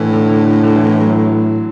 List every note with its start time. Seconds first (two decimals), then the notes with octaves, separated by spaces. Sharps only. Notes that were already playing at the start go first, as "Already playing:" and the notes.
Already playing: A2 D3 E3
0.13 D3
0.29 D3
0.46 D3
0.63 D3
0.75 E3
0.88 E3
1.00 F#3